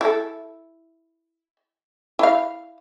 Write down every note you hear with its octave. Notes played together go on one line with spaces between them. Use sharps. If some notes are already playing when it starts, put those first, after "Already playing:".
E4 A4
E4 F5